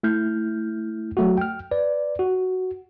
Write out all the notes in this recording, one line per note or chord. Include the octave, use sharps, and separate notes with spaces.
A3 E4 F6 G6
F#3 A3 F#4
G5 F6
B4 D5
F#4